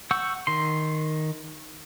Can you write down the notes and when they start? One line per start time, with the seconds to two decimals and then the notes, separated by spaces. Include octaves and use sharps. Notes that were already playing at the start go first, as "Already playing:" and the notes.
0.11 F#5 C#6 E6 G6
0.47 D#3 C6